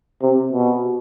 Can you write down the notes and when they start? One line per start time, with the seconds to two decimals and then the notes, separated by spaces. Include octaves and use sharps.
0.22 C3
0.53 B2